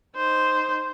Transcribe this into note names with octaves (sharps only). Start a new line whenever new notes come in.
D#4 C5